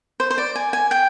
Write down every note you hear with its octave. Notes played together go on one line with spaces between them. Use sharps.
C5
C5
D5
G#5
G#5
G5